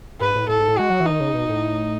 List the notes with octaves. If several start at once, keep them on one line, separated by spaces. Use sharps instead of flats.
G#2 B4
A2
A2 A4
G#2
A2
G#3 F#4
F#3
E3
D#3 D#4
C#3
B2
A2